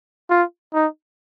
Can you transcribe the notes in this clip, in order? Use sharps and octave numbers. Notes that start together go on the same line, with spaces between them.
F4
D#4